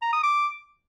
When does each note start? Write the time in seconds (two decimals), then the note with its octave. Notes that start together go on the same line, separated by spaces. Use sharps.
0.02 A#5
0.13 D#6
0.23 D6